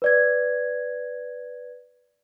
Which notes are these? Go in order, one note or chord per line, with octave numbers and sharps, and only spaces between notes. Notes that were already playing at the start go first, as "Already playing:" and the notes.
B4 D5 G#6